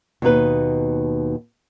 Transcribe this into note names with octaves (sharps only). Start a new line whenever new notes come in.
D#2 B2 D#4 B4